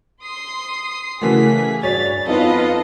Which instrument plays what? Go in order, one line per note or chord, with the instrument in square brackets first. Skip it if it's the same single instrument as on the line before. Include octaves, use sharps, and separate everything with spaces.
[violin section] C6 [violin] D#6 C7
[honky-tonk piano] C#3 E3 F#4 [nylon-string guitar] A3 A#4 F#5 [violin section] G#4 [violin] B6
[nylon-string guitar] G2 F#4 D5 [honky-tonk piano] C#5 B6 [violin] A6
[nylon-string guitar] F2 [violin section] B3 F4 B4 [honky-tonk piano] C4 D#4 [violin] A4 D#5